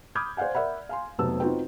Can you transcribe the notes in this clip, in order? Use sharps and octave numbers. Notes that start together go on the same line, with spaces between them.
B5 D6 D#6 F6 G6 G#6
C5 D5 F5 F#5 G#5
A#4 D5 E5 F#5 B5
F5 G#5 C6
F1 C3 F#3 B3 A5 E6
C4 D#4 F4 F#4 B4 G5